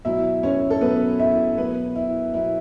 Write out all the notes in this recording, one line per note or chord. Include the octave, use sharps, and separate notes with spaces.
B2 F#3 E4 E5
C#4 C#5
A4
B2 F#3 B3 B4
E4 E5
B2 F#3 B3 B4
E4
B2 F#3 E4